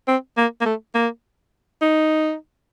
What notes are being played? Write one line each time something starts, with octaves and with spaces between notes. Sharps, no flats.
C4
A#3
A#3
A3
A#3
D#4